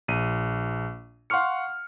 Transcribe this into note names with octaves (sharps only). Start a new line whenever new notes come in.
A#1 D#7
F5 F#5 C6 C#6 F6 C#7